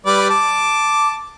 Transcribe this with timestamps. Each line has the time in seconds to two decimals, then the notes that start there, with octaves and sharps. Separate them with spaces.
0.06 G3 B4 D5
0.30 A5 D6